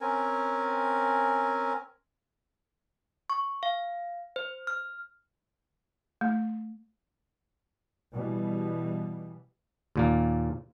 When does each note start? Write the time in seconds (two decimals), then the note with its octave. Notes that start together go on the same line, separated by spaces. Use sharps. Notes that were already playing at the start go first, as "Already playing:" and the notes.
0.01 C4 C#4 A#4 G#5
3.30 C#6
3.63 F5
4.36 C5
4.67 F6
6.21 A3
8.13 B2 E3 G3
9.96 D#2 A#2 A#3